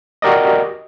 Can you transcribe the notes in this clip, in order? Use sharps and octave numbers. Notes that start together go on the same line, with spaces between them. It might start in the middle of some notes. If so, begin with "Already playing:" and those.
F#4 G4 A#4 D5 D#5